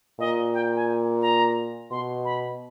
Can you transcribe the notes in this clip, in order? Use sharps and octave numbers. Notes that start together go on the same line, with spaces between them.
A#2 D#5
G5
G#5
A#5
B2 C6
B5